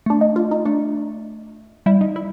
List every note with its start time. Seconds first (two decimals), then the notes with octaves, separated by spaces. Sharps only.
0.06 A3 D4
0.21 D#4
0.36 F4
0.51 D#4
0.65 A3 D4
1.86 G3 E4
2.01 D#4
2.16 E4